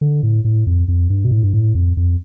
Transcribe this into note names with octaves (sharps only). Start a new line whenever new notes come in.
D3
A2
A2
F2
F2
G2
B2
A2
G2
A2
F2
F2